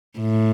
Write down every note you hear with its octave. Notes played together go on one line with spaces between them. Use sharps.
A2